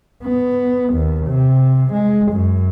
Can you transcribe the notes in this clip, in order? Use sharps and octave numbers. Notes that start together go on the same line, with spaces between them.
B3
D#2
C3
G#3
F#2